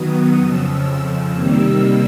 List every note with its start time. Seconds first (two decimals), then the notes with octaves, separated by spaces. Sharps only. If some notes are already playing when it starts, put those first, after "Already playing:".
Already playing: D#3 F#3 B3 D#6
0.39 F2 C#3 F3 E6
1.33 C3 D#3 G3 A#3